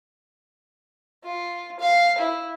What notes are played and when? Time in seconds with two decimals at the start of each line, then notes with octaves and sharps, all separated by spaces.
1.24 F4
1.80 F5
2.18 E4